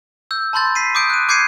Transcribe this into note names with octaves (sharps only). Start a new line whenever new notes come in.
E6 G6
A5 B5 C6 G6 A6
B6 C7 D#7
D6 D#6 G6 D7
F#6 D#7
D6 G6 G#6 C7 C#7 D#7